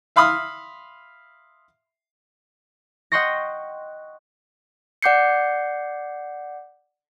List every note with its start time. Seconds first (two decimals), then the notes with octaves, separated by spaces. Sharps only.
0.16 E5 F5 B5 C6 D#6 F6
3.12 D#5 F#5 G5 C6 C#6 A#6
5.02 D5 F#5 D6 G6 C7 C#7